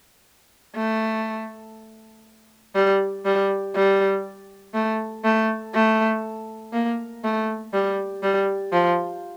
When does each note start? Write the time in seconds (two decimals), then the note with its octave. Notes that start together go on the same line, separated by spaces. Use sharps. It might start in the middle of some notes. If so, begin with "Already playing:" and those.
0.76 A3
2.75 G3
3.25 G3
3.75 G3
4.74 A3
5.24 A3
5.75 A3
6.73 A#3
7.24 A3
7.73 G3
8.23 G3
8.73 F3